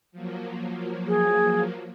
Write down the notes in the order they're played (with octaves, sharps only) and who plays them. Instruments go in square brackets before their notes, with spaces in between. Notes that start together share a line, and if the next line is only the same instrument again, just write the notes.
[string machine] F3 F#3 A#3
[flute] G#4